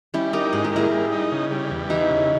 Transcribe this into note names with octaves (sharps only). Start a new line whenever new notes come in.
G3 C#4 E4
D#4 G4 A#4
G#2 G#4
G4
A#3 E4 G#4
G3
D#4
C#3
G3
E2
E3 D#4 G4
C#3